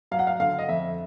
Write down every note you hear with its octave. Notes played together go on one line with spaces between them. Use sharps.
F#3 F5
F#5
F5
D3 F5
D#5
F2 E5